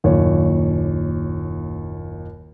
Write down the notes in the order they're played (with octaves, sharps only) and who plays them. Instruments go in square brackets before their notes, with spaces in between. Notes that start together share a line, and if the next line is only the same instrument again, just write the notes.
[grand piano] F#1 D#2 A#2 C#5